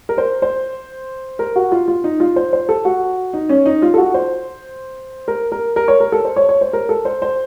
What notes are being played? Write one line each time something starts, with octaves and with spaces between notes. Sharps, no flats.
A#4
C5
C5
A#4
F#4
F4
F4
D#4
F4
C5
C5
A4
F#4
D#4
C#4
D#4
F4
A4
F#4
C5
A#4
A#4
A#4
C#5
A#4
A4
C5
C#5
C#5
C5
A#4
A4
C5
C5